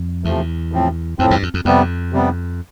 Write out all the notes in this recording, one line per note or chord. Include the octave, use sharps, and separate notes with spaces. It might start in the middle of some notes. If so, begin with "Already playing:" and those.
Already playing: F2
E2 C3 F3 A3
A2 F3 C4
F2 A2 F3 C4
E2 G2
F2
F2
F2 C3 G3 B3
C3 G3 B3